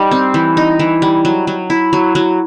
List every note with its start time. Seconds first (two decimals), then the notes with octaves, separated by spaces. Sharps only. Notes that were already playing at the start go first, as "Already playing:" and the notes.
Already playing: G3 D#4
0.11 C4
0.34 E3
0.57 D#4
0.79 E3
1.02 G3
1.25 F#3
1.47 F#3
1.70 E4
1.93 F#3
2.15 F#3